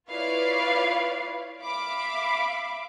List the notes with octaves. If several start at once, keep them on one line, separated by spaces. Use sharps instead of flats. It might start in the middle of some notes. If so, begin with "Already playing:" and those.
E4 F4 B4 C#5 D5 F5
E5 F5 B5 D6